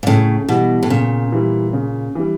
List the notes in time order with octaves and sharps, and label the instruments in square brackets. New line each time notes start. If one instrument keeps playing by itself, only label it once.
[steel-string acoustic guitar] A#2
[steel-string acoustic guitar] A2 [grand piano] C#3
[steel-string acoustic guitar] B2 [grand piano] E3 G3
[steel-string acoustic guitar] A2
[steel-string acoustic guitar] A#2 [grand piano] C#3
[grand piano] E3 G3
C#3
E3 G3